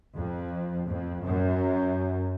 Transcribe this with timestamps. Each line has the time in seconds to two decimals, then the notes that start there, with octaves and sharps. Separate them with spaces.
0.14 F2
0.86 F2
1.22 F#2